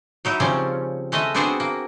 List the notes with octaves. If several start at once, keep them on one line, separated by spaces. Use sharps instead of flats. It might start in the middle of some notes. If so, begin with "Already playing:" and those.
F#3 D#4 E4
C#3 F3 G3 C4 C#4
G#3 A3 D#5 E5
B3 C4 D4 F#4 G#4 C5
A#3